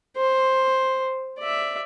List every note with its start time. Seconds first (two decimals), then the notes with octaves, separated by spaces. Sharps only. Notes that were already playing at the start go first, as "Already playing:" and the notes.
0.17 C5
1.38 D5 E5